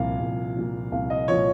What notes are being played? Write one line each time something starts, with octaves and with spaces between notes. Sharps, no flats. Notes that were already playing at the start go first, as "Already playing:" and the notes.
Already playing: C2 A#2 F3 F5
C2
A#2 F3
C2 F5
D#5
A#2 F3 C#5